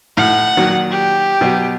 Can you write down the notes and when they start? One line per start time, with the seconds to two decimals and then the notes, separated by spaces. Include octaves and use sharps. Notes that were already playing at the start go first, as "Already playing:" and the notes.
0.17 A2 F#5 F6
0.57 A#2 D#3 F#3
0.91 G4
1.41 B2 F#3